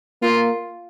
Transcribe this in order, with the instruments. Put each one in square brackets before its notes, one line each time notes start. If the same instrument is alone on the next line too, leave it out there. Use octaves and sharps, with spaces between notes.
[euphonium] A#3 [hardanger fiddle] F4